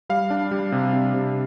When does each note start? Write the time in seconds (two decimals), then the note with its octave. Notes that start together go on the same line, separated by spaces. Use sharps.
0.09 G3 F5
0.30 D4
0.51 G3
0.72 C3
0.93 C3
1.14 C3